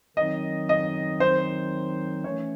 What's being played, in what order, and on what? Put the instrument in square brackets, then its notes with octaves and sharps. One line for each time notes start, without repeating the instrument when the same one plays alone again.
[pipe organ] D#3 F#3 C4 D#4 [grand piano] D#5
[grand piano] D#5
C5
[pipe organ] E3 A3 C#4 [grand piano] C#5